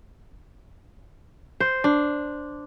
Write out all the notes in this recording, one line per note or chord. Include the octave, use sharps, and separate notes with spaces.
C5
D4